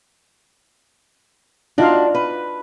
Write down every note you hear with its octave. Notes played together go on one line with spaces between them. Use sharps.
D4 D#4 F4 F#4 F5
B4